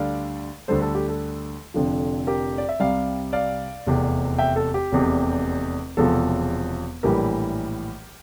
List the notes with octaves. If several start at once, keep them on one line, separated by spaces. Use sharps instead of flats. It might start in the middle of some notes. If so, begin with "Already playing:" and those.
Already playing: D2 D3 G3 D5 F5
D2 D3 G3 A4 C5
A4
G4
A4
F1 F2 D3 F3
G4 A#4
D5
E5
C2 C3 G3 D5 F5
D5 F5
F1 E2 C3
E5 G5
A4
G4
F1 E2 C3
E1 E2 C3 F3 A4
A#1 A2 E3 G3 G4 A#4